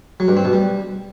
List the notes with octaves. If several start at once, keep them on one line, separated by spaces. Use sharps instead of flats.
F#3
G2
C4
B2
G3